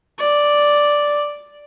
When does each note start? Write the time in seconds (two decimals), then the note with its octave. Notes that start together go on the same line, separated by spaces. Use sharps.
0.19 D5